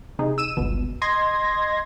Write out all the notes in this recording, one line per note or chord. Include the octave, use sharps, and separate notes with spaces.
C3 D#4 G#4
E6 D#7 E7
G1 C#2 B2
D#5 C6 G#6 A#6